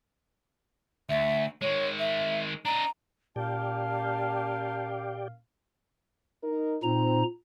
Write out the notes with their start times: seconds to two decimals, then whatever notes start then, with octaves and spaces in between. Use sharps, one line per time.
1.09 D2 E5
1.62 D#3 G#3 C#5
1.99 E5
2.65 D4 D#5 A#5
3.36 A#2 A#3 C#4 G4 D5 F5 G5 A5
6.44 D#4 A#4
6.83 A#2 C4 D#4 A#5